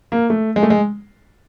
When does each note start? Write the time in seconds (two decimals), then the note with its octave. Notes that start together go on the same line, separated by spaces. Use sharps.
0.12 A#3
0.30 A3
0.56 G#3
0.63 A3
0.70 G#3